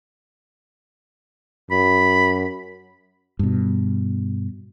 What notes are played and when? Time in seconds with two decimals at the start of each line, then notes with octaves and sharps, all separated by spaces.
1.71 F#2 B5
3.39 G2 B2